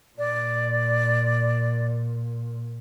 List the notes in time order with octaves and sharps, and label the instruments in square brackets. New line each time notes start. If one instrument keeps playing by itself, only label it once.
[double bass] A#2 [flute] D5